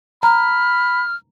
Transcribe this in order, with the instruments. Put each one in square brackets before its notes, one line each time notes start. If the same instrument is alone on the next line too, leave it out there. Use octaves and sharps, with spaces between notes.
[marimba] A#5 [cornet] B5 [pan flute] F6